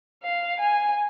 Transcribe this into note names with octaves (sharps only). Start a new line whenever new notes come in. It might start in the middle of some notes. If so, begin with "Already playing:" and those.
F5
G#5